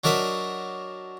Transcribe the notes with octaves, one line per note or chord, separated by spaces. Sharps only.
F#3 D4 A#4 D#5 E5